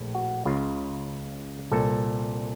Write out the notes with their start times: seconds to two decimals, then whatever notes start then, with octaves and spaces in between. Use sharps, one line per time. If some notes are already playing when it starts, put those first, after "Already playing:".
Already playing: A#1 A2
0.15 F#4
0.45 C#2 C#3 F4
1.71 C2 A#2 A4